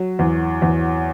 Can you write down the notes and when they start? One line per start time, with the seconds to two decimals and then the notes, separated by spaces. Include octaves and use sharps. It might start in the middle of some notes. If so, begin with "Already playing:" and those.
Already playing: F#3
0.19 E2
0.62 E2